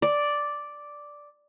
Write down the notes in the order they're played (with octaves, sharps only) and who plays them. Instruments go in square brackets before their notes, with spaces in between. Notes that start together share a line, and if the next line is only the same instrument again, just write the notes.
[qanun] D5